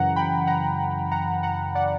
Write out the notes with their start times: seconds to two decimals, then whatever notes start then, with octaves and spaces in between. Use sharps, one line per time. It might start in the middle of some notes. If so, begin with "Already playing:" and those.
Already playing: F#2 C#3 E3 F#5 A#5
0.16 G5 B5
0.47 F#5 A#5
1.11 F#5 A#5
1.43 F#5 A#5
1.75 D5 F#5